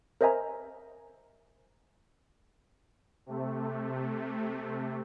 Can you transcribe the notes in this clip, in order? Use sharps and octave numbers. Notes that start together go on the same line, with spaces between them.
A#4 C5 D#5 E5 G#5 A#5
C3 A3